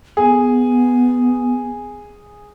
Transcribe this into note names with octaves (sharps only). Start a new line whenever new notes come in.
B3 G#4